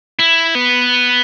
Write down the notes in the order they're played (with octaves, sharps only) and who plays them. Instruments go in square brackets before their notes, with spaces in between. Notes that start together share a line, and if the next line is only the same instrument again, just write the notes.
[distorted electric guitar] E4
B3